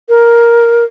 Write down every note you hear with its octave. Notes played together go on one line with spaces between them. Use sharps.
A#4